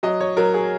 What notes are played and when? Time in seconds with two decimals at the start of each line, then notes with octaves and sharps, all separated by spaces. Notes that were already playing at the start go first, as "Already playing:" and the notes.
0.03 F#3 D#5
0.21 C#5
0.37 F#3 A#4
0.54 G#4